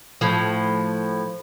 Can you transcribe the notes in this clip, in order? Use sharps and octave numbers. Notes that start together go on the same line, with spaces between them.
A2 F3